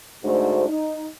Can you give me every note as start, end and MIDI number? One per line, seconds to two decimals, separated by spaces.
0.24 0.66 38
0.24 0.66 44
0.24 0.66 57
0.24 0.66 62
0.24 0.66 66
0.24 0.66 72
0.68 1.05 63